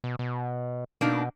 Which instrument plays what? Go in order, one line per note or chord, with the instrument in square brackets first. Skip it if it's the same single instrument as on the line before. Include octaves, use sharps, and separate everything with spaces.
[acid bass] B2
B2
[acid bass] B2 [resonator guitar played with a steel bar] A#3 D4 D#4